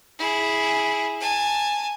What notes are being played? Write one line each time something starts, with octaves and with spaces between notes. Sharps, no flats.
E4 G#4
G#5 A5